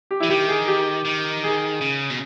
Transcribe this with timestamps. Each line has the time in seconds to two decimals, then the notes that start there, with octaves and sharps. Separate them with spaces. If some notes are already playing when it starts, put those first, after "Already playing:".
0.11 G4
0.20 E3 E4
0.30 D#3 G4
0.48 G#4
0.68 G4
1.05 D#3
1.44 G#4
1.81 C#3
2.10 B2